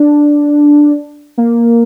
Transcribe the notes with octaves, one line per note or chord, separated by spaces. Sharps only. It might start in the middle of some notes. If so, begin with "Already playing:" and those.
Already playing: D4
A#3